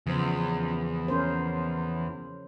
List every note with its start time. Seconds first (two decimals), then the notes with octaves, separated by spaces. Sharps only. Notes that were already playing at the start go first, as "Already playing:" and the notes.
0.07 E2 C#3 F3 C5
1.08 C#4 A#4 C5